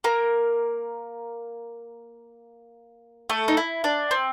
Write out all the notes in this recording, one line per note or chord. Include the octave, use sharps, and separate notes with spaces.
A#3 A#4
A3 A4
D#4
E4
D4
C4